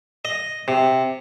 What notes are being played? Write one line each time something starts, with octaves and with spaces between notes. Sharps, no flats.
D#5
C3